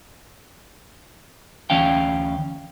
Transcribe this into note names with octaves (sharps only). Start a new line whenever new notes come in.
D2 E3 C#4 F5 G5